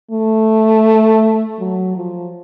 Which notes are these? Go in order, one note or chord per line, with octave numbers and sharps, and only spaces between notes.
A3
F#3
F3